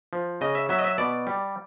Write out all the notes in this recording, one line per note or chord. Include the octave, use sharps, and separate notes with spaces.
F3
C#3 D#5
E5
F#3 E5
D#5
E5
B2 D5
G3